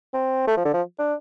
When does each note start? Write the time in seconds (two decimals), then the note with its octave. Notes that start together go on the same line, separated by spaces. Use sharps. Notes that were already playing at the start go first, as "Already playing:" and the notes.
0.14 C4
0.47 A3
0.57 F3
0.65 D3
0.74 F3
0.99 D4